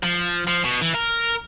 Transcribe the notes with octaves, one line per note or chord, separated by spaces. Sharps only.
F3
F3
B2
E3
A#4